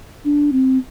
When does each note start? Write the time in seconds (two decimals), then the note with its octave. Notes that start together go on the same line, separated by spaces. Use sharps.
0.25 D4
0.52 C4